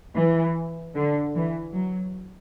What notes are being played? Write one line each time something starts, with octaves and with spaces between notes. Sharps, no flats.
E3
D3
E3
F#3